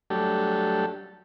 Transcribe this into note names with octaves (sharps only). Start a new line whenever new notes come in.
F#3 G3 A3 D4 G4 A4